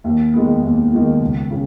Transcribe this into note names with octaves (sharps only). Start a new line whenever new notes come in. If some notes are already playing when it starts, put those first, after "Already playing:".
D#2
D#3 G#3 B3
D#2
D#3 G#3 B3
C#2
C#3